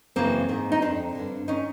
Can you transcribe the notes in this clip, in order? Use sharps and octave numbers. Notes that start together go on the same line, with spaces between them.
F#2 C#3 E3 A#3 C4
G#2 D#3
D#4
F2 D3 C4 D4
G2 D3
D#3 C#4 D#4